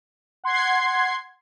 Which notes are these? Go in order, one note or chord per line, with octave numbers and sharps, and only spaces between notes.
F#5 C6 G#6 C7